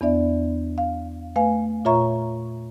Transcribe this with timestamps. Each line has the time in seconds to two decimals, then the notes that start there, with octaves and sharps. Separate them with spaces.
0.01 E2 B3 D4 D5 E5
0.78 F5
1.36 A3 B4 F5 G#5
1.85 A#2 F4 C#5 E5 A#5 C#6